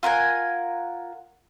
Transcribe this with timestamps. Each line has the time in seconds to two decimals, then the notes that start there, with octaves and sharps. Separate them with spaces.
0.03 F4 A#4 F#5 G#5